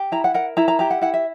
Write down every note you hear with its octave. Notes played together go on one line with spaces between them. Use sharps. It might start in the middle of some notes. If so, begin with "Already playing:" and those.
Already playing: G4
E4 A#5
F#5
A#4 F#5
E4 A#5
A#5
G4 A#5
F#5
E4 F#5
E5